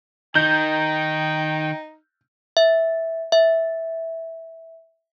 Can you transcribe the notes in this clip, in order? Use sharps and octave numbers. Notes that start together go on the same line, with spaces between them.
D#3 D#4 G5 G6
E5
E5